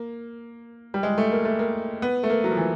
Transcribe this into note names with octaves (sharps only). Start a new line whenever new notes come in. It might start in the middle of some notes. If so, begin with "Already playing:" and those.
Already playing: A#3
G3
G#3
A3
A#3
A3
A#3
B3
A3
A#3
F#3
F3
E3